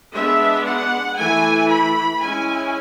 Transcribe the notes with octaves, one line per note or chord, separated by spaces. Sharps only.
G#3 B3 D4 E5
F#5
E3 A3 E4 G#5
B5
G#3 C#4 E4 G#5